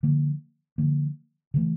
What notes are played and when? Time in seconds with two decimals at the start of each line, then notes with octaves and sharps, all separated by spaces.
0.03 D3 F3 A#3
0.78 D3 F3 A#3
1.54 C#3 E3 A3